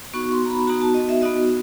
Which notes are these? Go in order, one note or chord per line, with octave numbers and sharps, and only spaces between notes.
B3 D#4 F#4 C#6
C6
A#5
B5
B3 D#4 F#4 A#5
A5
D#5
E5
B3 D#4 F#4 D#5